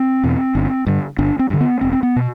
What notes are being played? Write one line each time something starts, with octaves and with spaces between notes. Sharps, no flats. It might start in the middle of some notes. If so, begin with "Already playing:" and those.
Already playing: C4
E2 B2
G1
G2 D3
G1 D4
C4
G2 D3
B3
E1 C4
C4
B3
B2